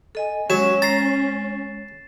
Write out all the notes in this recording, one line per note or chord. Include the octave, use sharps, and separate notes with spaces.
A4 D#5 G#5
F#3 G#3 C#4 E7
A#5 A6 C7